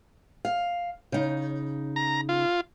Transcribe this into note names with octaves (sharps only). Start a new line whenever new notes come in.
F5
C#3 D#4
A#5
F4